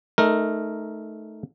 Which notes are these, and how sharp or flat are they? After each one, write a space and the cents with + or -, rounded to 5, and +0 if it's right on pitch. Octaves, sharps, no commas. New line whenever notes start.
A3 -15 D#4 +0 A#4 +0